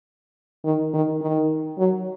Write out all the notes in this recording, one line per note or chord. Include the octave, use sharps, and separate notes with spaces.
D#3
D#3
D#3
F#3